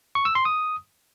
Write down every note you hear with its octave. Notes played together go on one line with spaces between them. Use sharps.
C#6
E6
C6
D#6